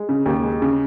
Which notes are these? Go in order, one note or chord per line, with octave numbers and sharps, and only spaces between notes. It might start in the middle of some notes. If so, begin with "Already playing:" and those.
Already playing: G#3
C#3
D#2
G#3
C#3